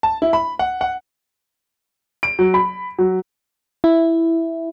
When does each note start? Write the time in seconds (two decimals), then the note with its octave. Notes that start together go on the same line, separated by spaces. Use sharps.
0.03 A5
0.22 E4
0.33 B5
0.59 F#5
0.81 F#5
2.23 D7
2.39 F#3
2.54 B5
2.99 F#3
3.84 E4